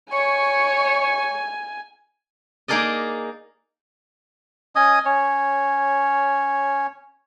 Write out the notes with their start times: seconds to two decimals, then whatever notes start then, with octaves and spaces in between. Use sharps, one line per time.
0.13 C#5 G#5 C#6
2.68 A#3 D#4 G#4 A#4 D5 D#5
4.76 C#4 D#5 G#5 D#6
5.05 C#4 C#5